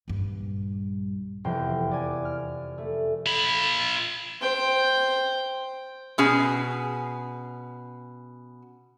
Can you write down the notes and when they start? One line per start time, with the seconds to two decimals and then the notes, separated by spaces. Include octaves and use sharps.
0.08 A#1 G2
1.44 F1 E2 C5 G5 C7
1.91 D5 G#5
2.25 F6
2.78 A3
3.26 F4 B5
4.41 C5 G5
6.18 B2 C#4 G#4 G#5